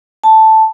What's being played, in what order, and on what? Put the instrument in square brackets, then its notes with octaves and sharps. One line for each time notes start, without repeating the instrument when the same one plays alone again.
[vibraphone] A5